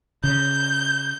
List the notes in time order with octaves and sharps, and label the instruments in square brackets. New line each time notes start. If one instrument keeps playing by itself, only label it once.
[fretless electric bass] C#3 [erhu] G6